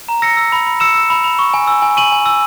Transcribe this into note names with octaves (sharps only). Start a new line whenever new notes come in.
A#5
E6 A#6 C#7
E6
B5
B5
E6 C#7 E7
E6
B5
B5
C#6
G#5
E6
G#5
C#6 D#7 F#7
G#5
E6